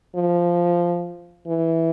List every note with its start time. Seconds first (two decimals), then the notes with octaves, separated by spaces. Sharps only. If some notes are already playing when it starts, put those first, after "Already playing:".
0.15 F3
1.48 E3